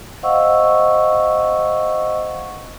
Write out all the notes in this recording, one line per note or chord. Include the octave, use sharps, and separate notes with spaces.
C5 D#5 F5 F#5 C#6 E6